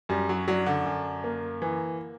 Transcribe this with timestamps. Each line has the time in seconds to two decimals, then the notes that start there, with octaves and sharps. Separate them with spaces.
0.09 F#2 G3
0.29 F#3
0.48 F#3 D4
0.66 D3
0.86 F#2
1.24 A#3
1.62 E3